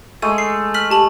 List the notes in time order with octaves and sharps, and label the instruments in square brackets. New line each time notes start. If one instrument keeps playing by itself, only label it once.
[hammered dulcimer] G#3 A3 [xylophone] D#7
[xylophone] C7
F6 B6 F#7
G4 A5 F#7